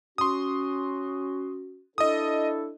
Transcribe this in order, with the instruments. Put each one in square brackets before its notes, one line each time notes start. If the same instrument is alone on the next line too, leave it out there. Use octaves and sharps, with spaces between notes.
[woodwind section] C#4 F#4 [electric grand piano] C6 D#6
[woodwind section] D4 E4 A4 [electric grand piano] D#5 D#6